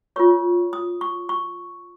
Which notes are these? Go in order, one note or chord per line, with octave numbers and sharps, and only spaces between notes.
F4 A#4 C#5 C#6
D#6
C#6
C#6